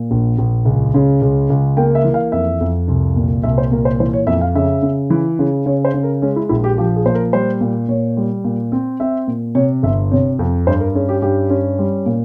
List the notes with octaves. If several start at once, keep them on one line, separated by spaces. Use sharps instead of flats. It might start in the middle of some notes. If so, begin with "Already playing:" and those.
Already playing: A#2
A#1
A#1
C#2
C#3
C#2
C#2
A#3 G5
E5
E3
F5
F2 E5
F2
C2
A#2
C2 E5
C5
A#2 A#4
C5
E3 C5
C#5
F2 E5
F5
C#3 E5
C#3
E3
C#3
C#3 C#5
C5
C#3
A#4
G#3 C#4
E4
A#1 E4
G4
F3 G4
G#4
A#2 C5
A#4
G3 C5
A#2
A#2 C#5
G3
A#2
C4
C4 E5
A#2
C3 C#5
G1 E5
C3 C#5
F2
G2 C5
A#4
C#4 G#4
G4
G2 G4
C#4
G3
A#2